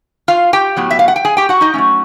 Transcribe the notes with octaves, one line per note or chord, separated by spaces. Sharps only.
F4 F5
G4 G5
A2 F#3 B3
E5
F5
F#5
G5
G#4 G#5
G4 G5
F#4 F#5
D#4 D#5
F#3 A3 C#4